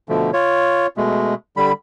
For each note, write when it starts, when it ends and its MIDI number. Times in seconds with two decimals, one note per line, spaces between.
0.09 0.31 47
0.09 0.31 50
0.09 0.31 53
0.09 0.31 57
0.33 0.87 65
0.33 0.87 73
0.97 1.34 47
0.97 1.34 56
0.97 1.34 57
1.57 1.72 50
1.57 1.72 55
1.57 1.72 83